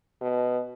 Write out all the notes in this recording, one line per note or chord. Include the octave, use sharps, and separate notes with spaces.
B2